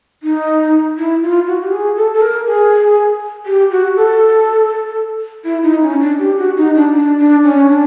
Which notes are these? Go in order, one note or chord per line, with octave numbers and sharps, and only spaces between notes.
D#4
E4
F4
F#4
G4
G#4
A4
A4
A#4
G#4
G4
F#4
A4
E4
D#4
C#4
D4
G4
F#4
D#4
D4
D4
D4
C#4
D4